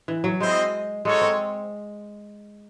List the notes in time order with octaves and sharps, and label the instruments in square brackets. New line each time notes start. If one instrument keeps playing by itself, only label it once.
[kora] E3
F#3
[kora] G#3 [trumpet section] C4 E4 C5 D#5
[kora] G#3 [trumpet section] D#4 F#4 A4 C#5
[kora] C4